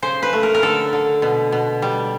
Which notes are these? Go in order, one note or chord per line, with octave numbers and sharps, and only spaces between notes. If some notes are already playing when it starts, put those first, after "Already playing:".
C#3 C5
B4
A3
A#4
A#4
D3 A4
D3
B2
B2
G3